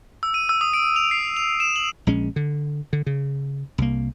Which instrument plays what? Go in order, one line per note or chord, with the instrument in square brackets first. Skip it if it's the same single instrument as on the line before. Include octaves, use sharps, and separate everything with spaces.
[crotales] E6
D#7
E6
D#6
D7
F7
C7
F7
E7
F#7
[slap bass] A#1 G#3 C#4
D3
D3
C#3
C2 A#3